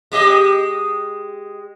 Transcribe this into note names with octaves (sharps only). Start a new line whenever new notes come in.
G#3 G4 D#5